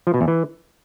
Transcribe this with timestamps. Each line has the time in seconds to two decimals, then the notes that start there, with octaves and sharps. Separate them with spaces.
0.07 F3
0.14 B2
0.21 E2
0.28 E3